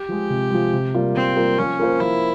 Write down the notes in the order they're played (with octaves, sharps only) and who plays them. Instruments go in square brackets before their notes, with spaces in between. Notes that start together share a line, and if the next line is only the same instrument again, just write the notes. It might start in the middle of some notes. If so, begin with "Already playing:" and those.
Already playing: [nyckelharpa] G4
[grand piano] F3 G#3
C3
F3 G#3
C3
G3 A#3 F4
[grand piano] C3 [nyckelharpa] C4
[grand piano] G3 A#3 F4
[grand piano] F3 [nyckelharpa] C#4
[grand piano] A#3 F4 C5
[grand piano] F3 [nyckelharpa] E4